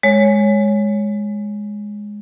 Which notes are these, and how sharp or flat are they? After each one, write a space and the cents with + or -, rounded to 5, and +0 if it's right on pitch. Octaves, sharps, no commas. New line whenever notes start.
G#3 +0 C#5 +0